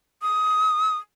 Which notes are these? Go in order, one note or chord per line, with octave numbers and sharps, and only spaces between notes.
D#6